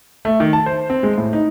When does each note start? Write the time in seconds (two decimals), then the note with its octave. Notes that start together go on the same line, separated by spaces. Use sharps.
0.25 A3
0.40 D#3
0.53 A5
0.66 C5
0.90 C4
1.03 G#3
1.18 A2
1.33 D#4